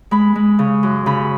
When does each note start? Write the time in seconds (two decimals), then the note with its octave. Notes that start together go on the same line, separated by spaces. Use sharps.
0.11 G#3 B5
0.35 G#3
0.59 C#3
0.83 F#2
1.06 C#3 B5